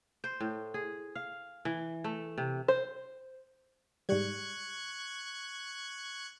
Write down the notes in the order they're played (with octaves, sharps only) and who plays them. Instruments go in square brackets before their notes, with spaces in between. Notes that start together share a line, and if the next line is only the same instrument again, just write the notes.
[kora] C5
A2
G#4
F5
E3
A3
C3
[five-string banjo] C5
[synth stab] G#2 G3 [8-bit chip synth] C#6 F#6 G#6